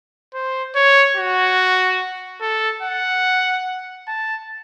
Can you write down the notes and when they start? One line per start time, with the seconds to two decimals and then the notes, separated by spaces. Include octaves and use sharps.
0.34 C5
0.75 C#5
1.17 F#4
2.41 A4
2.82 F#5
4.07 A5